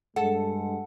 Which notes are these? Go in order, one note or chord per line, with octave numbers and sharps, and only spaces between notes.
G2 G#3 A4 F#5